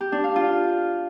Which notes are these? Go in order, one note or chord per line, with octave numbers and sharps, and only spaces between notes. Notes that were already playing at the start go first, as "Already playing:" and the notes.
G4
D4
F5
F4